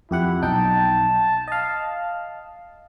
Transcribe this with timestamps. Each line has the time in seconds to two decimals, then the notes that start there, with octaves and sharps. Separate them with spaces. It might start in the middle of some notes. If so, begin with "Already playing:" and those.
0.11 F2 E4 G4 F#5
0.42 B1 D#4 G5 A5
1.48 D#5 F5